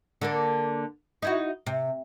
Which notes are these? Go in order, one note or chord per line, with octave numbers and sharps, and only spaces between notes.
D3 A#3 A4
D#4 E4 F#4
C3